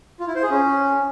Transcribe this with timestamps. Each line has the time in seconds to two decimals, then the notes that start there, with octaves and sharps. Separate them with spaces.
0.20 F4
0.28 E4
0.35 C5
0.43 G#4
0.51 C#4